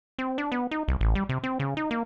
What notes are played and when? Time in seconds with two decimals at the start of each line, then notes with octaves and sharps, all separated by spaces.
0.19 C4
0.38 D4
0.52 B3
0.71 D#4
0.88 C2
1.01 A1
1.15 G3
1.29 C3
1.43 C4
1.60 C#3
1.77 D#4
1.91 A#3